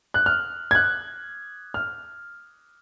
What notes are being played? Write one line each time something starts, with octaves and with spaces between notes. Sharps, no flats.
F#6
F6
G#6
F#6
F6